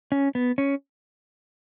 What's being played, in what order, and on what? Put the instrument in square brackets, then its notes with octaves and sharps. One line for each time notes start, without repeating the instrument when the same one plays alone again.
[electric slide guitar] C#4
B3
C#4